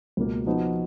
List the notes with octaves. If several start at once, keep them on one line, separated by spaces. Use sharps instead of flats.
C#2 B2 A#3
F3 B3 D#4 F#4